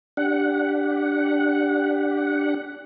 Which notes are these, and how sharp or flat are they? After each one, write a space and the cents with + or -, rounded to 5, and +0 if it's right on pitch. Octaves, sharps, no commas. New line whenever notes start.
D4 +0 G4 +0 F#5 +0